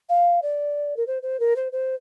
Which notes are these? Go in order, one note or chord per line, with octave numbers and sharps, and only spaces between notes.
F5
D5
A#4
C5
C5
A#4
C5
C5